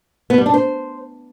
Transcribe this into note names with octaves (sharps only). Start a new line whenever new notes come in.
B3
G3
D4
C5